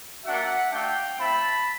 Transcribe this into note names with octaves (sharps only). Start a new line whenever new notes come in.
A#3 D4 F#4 E5 F#5
A3 D4 F#4 F5 G5
A3 C4 E4 A5 B5